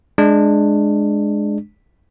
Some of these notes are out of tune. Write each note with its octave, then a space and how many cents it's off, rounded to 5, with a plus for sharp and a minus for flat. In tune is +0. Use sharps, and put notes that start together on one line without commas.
G#3 +10 D4 +15